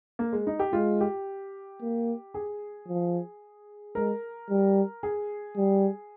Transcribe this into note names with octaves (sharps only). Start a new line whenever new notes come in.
A#3
G#3
D#4
G4
G#3 F4
G4
A#3
G#4
F3
G#3 A#4
G3
G#4
G3